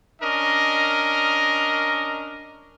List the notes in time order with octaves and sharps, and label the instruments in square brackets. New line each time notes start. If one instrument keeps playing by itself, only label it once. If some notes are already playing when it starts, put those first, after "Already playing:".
[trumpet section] C#4 D4 A#4 D#5